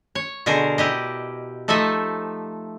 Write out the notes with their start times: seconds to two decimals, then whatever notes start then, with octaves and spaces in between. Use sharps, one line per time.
0.15 C#5
0.46 B2 D3 G#4 A#4 C5 A#5
0.78 E4 G4 D#5
1.68 F3 A3 D#4 A4 D#5 E5